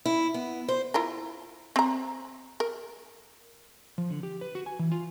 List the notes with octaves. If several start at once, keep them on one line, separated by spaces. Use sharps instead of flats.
E4
B3
C5
E4 F4 A#4
C4 A#5
A#4
F3
D3
G4
B4
F#4
G#5
E3
F4